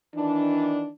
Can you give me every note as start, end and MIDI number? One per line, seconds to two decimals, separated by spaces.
0.15 0.88 51
0.15 0.88 52
0.15 0.88 62